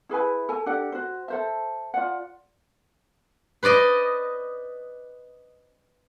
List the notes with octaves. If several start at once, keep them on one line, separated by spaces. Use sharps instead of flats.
E4 G#4 B4 G#5
A4 G#5
D4 G4 A4 F#5
F#4 C5
A4 C5 E5
F4 D5 F#5
B4 C5 D5 D#5